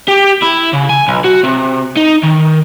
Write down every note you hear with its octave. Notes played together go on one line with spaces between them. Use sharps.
G4
E4
C#3
G#5
B1
F#4
C3
D#4
D#3